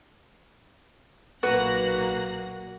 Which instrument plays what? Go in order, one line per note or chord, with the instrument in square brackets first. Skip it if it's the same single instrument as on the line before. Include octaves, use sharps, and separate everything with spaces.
[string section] B1 F#6 A#6 [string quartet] A#2 A#3 [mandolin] F#4 [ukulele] B4